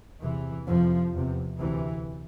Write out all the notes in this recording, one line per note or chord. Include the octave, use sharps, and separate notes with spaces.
E2 C3 E3
F2 C3 F3
E2 C3
D2 C3 E3